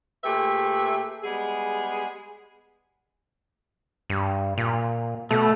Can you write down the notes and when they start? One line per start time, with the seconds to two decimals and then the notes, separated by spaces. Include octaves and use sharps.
0.24 A#2 A3 G4 G#4 B4 E5
1.23 G3 G#3 B3 G#4
4.10 G2
4.58 A#2
5.31 B2 A3